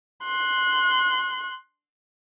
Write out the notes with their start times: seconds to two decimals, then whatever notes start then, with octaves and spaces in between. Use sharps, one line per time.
0.24 C6 F#6